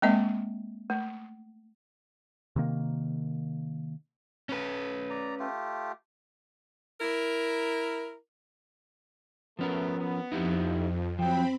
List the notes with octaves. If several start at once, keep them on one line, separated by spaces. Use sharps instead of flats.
G#3 A#3 C4 D#5 E5
A3
C3 D#3 A#3
C#4 B4
D5 A#5
A3 F4 G4
E4 A#4
F3 A3 B3 C#4 A#4
B3
F2 D#4 E4 G4
F3 F#3 C4 G5 B5